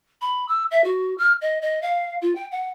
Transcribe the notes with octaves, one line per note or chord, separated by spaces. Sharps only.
B5
E6
E5
F#4
F6
D#5
D#5
F5
F4
G5
F#5